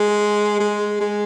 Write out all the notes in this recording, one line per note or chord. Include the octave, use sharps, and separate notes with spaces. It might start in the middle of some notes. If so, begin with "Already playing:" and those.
Already playing: G#3
G#3
G#3